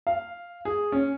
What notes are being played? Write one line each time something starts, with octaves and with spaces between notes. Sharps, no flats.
F5
G#4
C#4